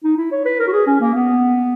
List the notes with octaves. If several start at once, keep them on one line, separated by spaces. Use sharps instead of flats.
D#4
E4
C#5
B4
A#4
F#4
G#4
C#4
A#3
B3